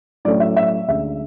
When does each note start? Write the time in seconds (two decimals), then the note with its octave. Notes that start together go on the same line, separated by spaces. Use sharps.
0.25 A2 F#3 A3 C#4 D5
0.40 E5
0.56 E5
0.88 D2 D3 G#3 C#4 E5